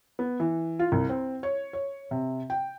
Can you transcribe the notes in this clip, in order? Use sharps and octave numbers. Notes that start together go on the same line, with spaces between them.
B3
E3
F4
C2
C4
C#5
C#5
C3
G5